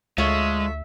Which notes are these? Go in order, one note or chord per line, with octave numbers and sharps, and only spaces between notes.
D2 G#3 F4 A4 C#5 E5